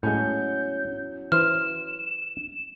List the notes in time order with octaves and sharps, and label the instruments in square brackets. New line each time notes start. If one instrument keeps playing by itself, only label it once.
[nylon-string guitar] E2 F#3 C#4 [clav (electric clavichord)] A2 G#3 [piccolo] G6
[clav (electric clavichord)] E3 C5 [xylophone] F6 [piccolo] E7